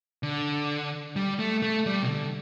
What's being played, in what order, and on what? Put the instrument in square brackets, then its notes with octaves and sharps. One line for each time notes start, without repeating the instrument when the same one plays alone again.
[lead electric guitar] D3
G3
A3
A3
G3
B2
D3